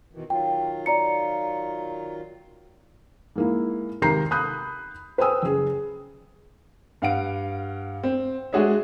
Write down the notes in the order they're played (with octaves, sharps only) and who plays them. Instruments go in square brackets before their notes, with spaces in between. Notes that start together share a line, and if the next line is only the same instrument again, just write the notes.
[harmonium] B2 D#3 E3
[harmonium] D#3 F#3 F4 [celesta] G5
[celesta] D5 A#5 C#7
[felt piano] G#2 A#3 E4
G#1 C3 A#4 A#5 G6 C7
B5 D#6 F#6 G6
B4 C5 G5 G#5 D#6 E6
F#1 G#4
[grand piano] G2 F5 F#5 D7
C4
G#3 D4 F#4 G#4 C#5 E5